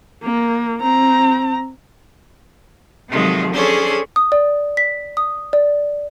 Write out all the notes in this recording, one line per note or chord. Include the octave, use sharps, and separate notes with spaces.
A#3
C4 A#5
C3 D#3 F3 F#3 G#3 A3
C#4 D4 G#4 A4 C5 C#5
D#6
D5
B6
D#6
D5